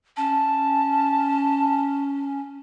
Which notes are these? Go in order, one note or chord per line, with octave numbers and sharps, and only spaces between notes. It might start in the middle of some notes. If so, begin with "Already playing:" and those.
C#4 A5